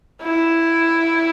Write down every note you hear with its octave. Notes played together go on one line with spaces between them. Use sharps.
E4